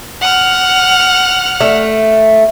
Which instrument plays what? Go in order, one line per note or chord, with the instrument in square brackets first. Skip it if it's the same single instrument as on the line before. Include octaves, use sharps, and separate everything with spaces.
[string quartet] F#5 F6
[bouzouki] A3